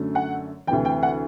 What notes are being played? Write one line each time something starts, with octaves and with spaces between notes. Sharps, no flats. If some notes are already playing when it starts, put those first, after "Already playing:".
Already playing: F#2 D3 F#3 A3
F#5
D2 C3 E3 G5
G5
F#5